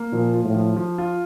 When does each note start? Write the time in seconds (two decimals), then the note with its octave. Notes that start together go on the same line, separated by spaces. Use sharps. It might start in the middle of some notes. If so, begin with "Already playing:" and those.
Already playing: A#3
0.13 A#2 F3
0.34 F4
0.44 A2
0.54 F3
0.76 F3
0.98 F4